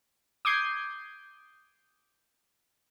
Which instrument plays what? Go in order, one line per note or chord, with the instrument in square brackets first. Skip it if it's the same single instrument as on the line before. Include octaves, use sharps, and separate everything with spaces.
[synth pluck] D6 D#6 G6 G#6 C7